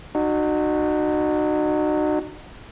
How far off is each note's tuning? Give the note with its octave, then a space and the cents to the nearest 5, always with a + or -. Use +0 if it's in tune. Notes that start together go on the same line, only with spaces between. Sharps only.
D#4 -40 F#4 +0